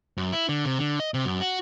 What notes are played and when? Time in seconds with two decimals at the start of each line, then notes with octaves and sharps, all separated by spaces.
0.18 F#2
0.33 E4
0.49 D3
0.65 C3
0.79 D3
1.00 D#5
1.14 C3
1.25 F#2
1.41 F#4